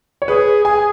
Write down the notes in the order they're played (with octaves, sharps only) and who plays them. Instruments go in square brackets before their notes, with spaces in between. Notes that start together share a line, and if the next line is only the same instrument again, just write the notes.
[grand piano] C#5
[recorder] G#4 [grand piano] B4
[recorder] G#4 [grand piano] G#5